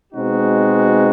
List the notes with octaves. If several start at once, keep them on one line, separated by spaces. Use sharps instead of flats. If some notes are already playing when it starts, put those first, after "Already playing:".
B2 G#3 C4 D#4 F#4